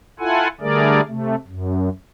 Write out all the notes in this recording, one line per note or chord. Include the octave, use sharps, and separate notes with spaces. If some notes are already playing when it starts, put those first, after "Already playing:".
E4 F4 A4 F#5 G#5
D3 G3 A3 G#4 A#4 D5
C3 A3
F#2